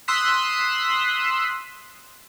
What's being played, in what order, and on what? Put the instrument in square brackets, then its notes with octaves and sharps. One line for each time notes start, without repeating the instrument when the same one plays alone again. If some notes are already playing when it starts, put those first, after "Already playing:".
[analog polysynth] C6 D#6 E6 F#6 B6